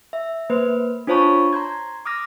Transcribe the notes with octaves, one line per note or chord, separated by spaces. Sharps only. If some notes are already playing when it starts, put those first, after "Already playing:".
E5
A#3 B4 C5
D4 F4 C5 C#5 A5 C#6
A#5 C6 G6 G#6
D6 D#6 F6 A#6